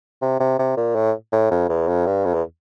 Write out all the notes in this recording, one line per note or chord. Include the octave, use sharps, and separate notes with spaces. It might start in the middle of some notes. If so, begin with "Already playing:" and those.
C3
C3
C3
A#2
A2
A2
F2
E2
F2
G2
F2
E2